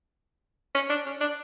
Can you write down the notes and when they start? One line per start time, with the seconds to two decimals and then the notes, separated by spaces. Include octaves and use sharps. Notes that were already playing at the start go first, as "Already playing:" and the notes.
0.75 C#4
0.90 D4
1.06 C#4
1.21 D4